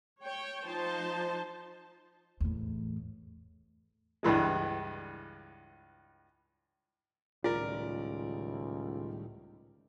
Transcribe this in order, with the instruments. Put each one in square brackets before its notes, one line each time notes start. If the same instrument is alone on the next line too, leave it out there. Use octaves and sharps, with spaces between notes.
[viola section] C#5 G5
F3 D#4 C5 A5
[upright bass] E2 A2
[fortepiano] C#2 G2 E3 G#3
[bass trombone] C#2 [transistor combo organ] A2 D#3 G3 [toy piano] F4 [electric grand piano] A#4 D5